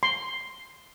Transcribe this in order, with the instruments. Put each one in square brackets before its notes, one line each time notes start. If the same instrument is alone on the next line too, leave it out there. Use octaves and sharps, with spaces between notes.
[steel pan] C6